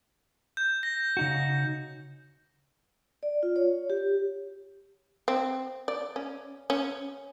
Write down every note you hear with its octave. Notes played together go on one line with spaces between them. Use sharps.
G6
A#6
C#3 D#4 F#4
D5
F4
C#5
G4
C4
D5
C#4
C#4